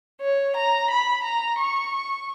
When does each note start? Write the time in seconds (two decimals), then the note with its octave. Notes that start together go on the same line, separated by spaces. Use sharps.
0.21 C#5
0.56 A#5
0.91 B5
1.24 A#5
1.59 C#6